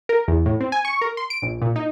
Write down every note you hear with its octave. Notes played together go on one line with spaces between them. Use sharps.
A#4
E2
A2
C4
G#5
C#6
A#4
C6
D7
A#1
A#2
D#4